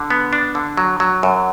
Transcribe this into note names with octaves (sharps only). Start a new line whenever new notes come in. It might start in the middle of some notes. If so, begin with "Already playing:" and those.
Already playing: D3
B3
D4
D3
F#3
F#3
F#2